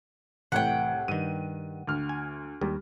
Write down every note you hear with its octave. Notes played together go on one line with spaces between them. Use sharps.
C2 A2 E3 F#5 G5
G2 D#3 D#7
D2 F6
G#5
D#2 G3